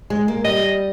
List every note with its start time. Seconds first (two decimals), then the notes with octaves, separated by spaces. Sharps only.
0.10 G#3
0.28 A#3
0.45 G3 D#5